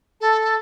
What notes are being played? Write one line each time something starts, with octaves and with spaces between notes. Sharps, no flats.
A4